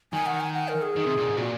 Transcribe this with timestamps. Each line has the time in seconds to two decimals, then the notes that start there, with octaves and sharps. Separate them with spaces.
0.13 D#3 G#5
0.26 F#5
0.40 G#5
0.54 F#5
0.68 A#4
0.82 G#4
0.96 D#3
1.06 C3
1.17 A#2
1.27 G#2
1.37 A#2 F#4